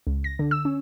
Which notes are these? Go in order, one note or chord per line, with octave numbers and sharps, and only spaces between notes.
C#2
A#6
D3
E6
C#4